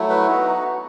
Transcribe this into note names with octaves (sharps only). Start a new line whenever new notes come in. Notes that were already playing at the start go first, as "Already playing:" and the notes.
Already playing: F#3 A3 E4
B4
B3 D#4 F#4